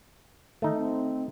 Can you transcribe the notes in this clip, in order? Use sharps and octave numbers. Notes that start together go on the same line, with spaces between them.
D#3 A3 D#4
C4